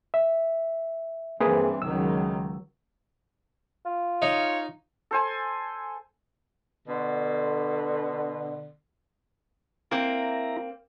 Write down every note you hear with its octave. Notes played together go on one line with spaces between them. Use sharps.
E5
G2 E3 A#3 C4 G#4 B4
C#2 D#3 F#3 E6
F4
D#4 C#5
A4 C5 G#5
B2 D3
A#3 C4 E4 A#5